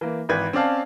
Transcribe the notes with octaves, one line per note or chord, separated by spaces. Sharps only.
E3 A#3
G#1 E3 B4 G#6
C4 C#4 D5 F5 A5